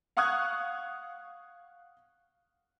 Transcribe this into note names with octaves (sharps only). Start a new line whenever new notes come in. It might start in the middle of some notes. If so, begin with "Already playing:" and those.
F5 F#5 C#6 D#6 F#6 G#6